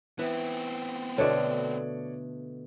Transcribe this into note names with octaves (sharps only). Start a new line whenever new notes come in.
E3 B3 C4 E4
B2 D3 A3 C#5 D5